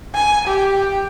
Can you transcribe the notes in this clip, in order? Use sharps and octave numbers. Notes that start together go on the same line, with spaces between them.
G#5
G4